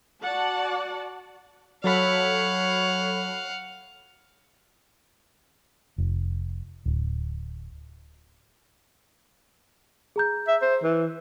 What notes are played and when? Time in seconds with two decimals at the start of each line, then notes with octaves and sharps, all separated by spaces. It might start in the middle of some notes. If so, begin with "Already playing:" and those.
0.23 F#4 D5 F#5 A5
1.84 F#3 A4 C#5 F5 F#5 B5
5.98 F1
6.86 D1
10.16 G#4 A#5 G6
10.48 E5
10.62 C5
10.83 E3